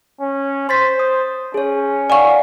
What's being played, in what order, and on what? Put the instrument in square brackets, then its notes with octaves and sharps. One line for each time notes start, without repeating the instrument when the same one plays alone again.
[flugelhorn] C#4
[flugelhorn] C5 [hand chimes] C6 A6 B6
[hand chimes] D#6
[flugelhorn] C#4 [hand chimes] G#4 C#5
[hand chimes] D5 F5 F#5 [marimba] G#5 C#6